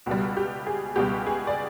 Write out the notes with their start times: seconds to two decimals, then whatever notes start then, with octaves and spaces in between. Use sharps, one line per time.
0.06 C#2 B2 G3 F#4
0.37 G4
0.67 G#4
0.96 C#2 B2 G3 G4
1.26 G#4
1.47 D5